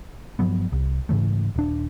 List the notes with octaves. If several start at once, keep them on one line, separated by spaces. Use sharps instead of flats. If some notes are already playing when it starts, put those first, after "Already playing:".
G2 F3 F#3 B3
C2
G#2 C#3 E3 A3
D#1 D4